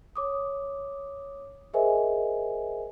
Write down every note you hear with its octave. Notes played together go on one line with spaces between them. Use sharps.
C#5 D6 D#6
G#4 A#4 C5 D#5 E5 G#5